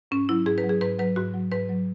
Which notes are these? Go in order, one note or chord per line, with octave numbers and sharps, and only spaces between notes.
G#2 C#4
F#3 E4
G#2 G#4
B4
F#3
G#4
G#2 B4
F#3 B4
G#2 F#4
F#3
G#2 B4
F#3